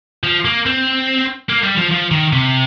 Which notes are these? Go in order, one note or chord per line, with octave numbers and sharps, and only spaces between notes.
F3
A#3
C4
A#3
G3
F3
F3
D#3
C3